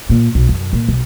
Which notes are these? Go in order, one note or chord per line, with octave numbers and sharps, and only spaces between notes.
A#2
B1
F#2
A#2
B1